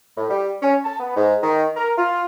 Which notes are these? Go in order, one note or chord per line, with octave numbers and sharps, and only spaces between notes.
A2
G3
C#4
A5
B3
G#2
D#3
A#4
F4